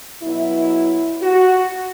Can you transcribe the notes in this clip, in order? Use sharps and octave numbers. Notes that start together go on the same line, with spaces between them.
B2 F#3 E4
F#4